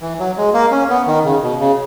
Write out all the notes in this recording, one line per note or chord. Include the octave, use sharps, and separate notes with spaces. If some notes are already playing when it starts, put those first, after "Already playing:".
E3
F#3
G#3
A#3
C#4
B3
D#3
C#3
B2
C#3